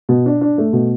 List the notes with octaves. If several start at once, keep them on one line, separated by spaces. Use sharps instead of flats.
B2
D4
D4
A3
B2